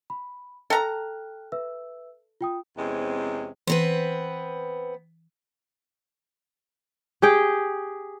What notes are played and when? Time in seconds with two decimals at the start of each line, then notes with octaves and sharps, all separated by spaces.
0.10 B5
0.70 A4 G5 A#5 F6 F#6
1.52 B4 E5 E6
2.41 F4 G5 D#6
2.77 E2 C3 G#3 C4 C#4
3.67 E3 B3 C4 B4
7.22 G4 G#4 G5